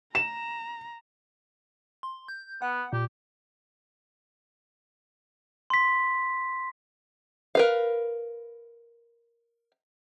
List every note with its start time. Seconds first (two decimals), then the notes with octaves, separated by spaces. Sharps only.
0.15 A#5 E7
2.03 C6
2.28 G6
2.62 B3 F#5
2.93 A#2 G4
5.70 C6 B6
7.55 A#4 B4 F5